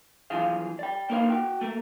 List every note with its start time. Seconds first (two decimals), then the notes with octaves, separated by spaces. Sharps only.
0.30 B1 E3 F3 F4 G#4 F5
0.79 D5 G5
1.10 A#3 D#4 A#4 C5 F5
1.30 F#4 G5
1.61 A3 A#3